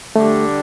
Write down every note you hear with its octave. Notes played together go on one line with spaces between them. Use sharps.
D3 G3 A3 D4 G4